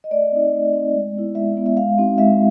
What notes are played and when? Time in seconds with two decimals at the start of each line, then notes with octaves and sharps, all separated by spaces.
0.04 D#5
0.11 A3 D5
0.32 C4 D#4
0.53 A3
0.73 C4 D#4
0.94 G#3
1.15 B3 E4
1.35 G#3 E5
1.56 B3 E4
1.66 E5
1.77 G#3 F5
1.98 C4 D#4 F#4
2.18 G#3 E5